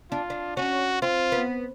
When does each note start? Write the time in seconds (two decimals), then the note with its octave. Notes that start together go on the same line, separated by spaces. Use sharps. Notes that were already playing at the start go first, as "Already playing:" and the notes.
0.11 D4 F4
0.30 D4
0.57 C#4 F#4
1.02 C4 F4
1.32 B3